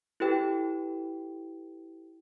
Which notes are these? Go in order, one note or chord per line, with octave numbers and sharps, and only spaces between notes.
E4 G4 A4 B4 G5